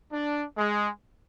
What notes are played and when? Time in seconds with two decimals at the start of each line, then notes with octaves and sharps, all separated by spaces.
0.12 D4
0.57 G#3